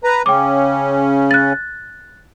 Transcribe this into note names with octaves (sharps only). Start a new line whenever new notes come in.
B4 A#5
C#3 C#4 G5 D6
F#6 A6